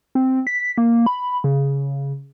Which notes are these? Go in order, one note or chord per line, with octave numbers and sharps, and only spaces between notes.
C4
B6
A#3
B5
C#3